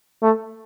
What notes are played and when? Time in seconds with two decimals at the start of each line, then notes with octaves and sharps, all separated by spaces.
0.22 A3